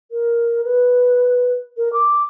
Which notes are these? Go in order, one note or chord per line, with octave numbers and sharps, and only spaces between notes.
A#4
B4
A#4
D6